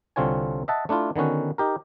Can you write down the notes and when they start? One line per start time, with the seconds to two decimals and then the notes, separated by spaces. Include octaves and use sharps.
0.16 C2 D3 C4 F4 C#5 G#5
0.68 D#5 E5 F#5 A5
0.89 A3 D4 E4 F4
1.16 D3 D#3 B3 C#4 F#4
1.58 D#4 G4 A#4